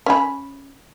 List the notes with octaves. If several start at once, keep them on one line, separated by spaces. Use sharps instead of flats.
C#4 B5